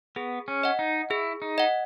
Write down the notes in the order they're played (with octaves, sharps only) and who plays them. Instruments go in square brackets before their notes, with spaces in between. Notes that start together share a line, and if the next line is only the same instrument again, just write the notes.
[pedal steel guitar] B3 [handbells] G#4
[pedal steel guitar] C#4
[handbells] D#5 F#5
[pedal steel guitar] D#4
[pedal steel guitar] E4 [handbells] G#4
[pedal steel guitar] D#4
[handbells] D#5 F#5